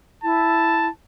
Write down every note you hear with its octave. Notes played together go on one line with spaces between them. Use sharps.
E4 A5